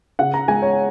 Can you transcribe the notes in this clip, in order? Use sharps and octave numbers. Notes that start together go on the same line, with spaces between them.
C#3 F#5
A#5
G#3 G#5
C#5